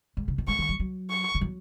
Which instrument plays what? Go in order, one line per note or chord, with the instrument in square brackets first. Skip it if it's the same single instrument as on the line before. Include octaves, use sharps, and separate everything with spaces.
[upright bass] G#2
C#3
D#3
[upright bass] G#3 [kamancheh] C#6
[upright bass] D#3
F#3
F#3
[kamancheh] C#6
[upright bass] D#3
F#3